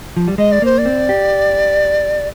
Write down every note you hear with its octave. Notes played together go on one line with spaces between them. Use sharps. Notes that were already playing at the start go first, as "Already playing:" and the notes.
F3
G3
G#3 D#5
D5
A#3 C5
D5
C4
G4